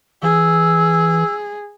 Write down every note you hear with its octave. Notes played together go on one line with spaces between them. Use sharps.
E3 G#4 E6